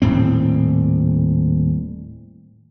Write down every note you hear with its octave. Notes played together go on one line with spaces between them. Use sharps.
D#1 A2 C4